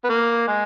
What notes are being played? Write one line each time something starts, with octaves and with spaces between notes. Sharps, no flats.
B3
A#3
G#3